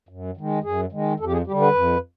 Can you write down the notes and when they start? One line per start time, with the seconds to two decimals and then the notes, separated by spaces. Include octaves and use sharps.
0.09 F#2
0.37 D#3 G#3
0.64 F#2 G#4
0.92 D#3 G#3
1.20 F2 A4
1.26 G4
1.32 G#4
1.47 G3 G4
1.51 D3
1.61 B4
1.74 F2